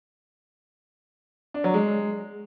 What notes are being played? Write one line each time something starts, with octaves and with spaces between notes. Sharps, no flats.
D4
F#3
G#3